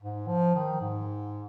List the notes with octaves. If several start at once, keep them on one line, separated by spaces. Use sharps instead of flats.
G#2
F3
D#3
G#2